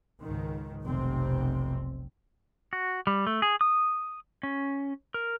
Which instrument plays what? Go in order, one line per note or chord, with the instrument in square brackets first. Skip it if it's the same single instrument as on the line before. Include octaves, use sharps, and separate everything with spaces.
[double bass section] C#2 G#2 D#3
F1 B1 C3 C4
[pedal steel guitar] F#4
G3
A3
G#4
D#6
C#4
A#4